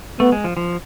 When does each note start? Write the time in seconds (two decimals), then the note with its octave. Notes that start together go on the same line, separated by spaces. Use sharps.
0.20 A3 B3
0.32 G#3
0.44 F3
0.57 F3